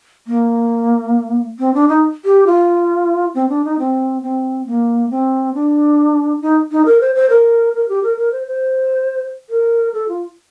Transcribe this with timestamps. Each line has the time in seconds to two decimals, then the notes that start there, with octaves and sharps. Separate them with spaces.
0.27 A#3
1.59 C4
1.74 D4
1.89 D#4
2.25 G4
2.47 F4
3.35 C4
3.49 D4
3.65 D#4
3.79 C4
4.23 C4
4.67 A#3
5.11 C4
5.54 D4
6.42 D#4
6.72 D#4
6.86 A#4
7.01 C5
7.15 C5
7.30 A#4
7.75 A#4
7.89 G4
8.03 A#4
8.18 A#4
8.32 C5
8.47 C5
9.50 A#4
9.94 A4
10.09 F4